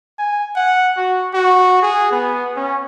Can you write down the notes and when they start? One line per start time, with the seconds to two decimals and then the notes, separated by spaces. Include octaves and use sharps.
0.19 G#5
0.56 F#5
0.97 F#4
1.34 F#4
1.82 G#4
2.11 B3
2.56 C#4